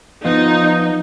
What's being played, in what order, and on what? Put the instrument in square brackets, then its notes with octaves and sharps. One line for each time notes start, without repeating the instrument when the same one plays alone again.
[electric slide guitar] F3 B3 F4 [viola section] D#4